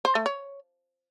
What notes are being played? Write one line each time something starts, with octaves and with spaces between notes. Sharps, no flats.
C5
A3
C#5